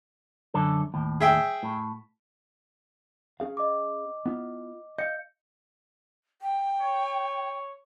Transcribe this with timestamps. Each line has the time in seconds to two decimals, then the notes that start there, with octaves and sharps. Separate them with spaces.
0.54 F#2 D3 A4
0.94 D#2 A2
1.20 G#4 E5 G5
1.63 A2
3.40 C#4 G#4 F5
3.57 D#5 D6
4.26 B3 E4 F4
4.98 D#5 F5 G6 C#7
6.42 G5
6.80 C#5